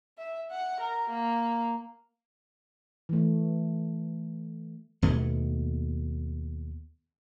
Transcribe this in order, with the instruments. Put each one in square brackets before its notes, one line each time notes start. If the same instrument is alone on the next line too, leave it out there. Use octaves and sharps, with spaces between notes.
[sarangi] E5
F#5
A#4
A#3
[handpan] E3 A3
[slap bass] D#2 B2 A3